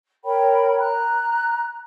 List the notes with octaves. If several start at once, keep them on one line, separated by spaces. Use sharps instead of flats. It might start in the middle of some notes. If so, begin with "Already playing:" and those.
A#4 C#5 G5 B5
A#5 F#6